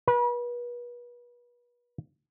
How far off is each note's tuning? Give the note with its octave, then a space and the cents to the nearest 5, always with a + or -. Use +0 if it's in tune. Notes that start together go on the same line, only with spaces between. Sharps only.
B4 -35